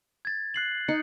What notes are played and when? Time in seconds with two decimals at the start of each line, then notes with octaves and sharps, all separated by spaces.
0.25 G#6 A6
0.54 F#6 C7 F#7
0.88 D#4 C#7